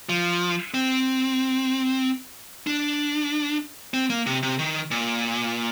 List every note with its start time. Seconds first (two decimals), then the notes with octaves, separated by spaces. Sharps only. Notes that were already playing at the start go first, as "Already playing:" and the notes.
0.09 F3
0.74 C4
2.67 D4
3.94 C4
4.10 A#3
4.26 C3
4.43 C3
4.59 D#3
4.91 A#2